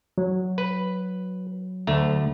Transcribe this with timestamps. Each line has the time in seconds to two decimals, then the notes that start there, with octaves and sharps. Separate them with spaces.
0.18 F#3
0.58 B4
1.87 D2 A3 A#5